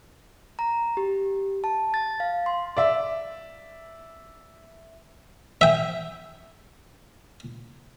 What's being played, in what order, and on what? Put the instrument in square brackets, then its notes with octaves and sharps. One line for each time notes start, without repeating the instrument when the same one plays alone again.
[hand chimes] A#5
G4
A5
A6
F5
C6
[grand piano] D5 E5
[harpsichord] E5 G5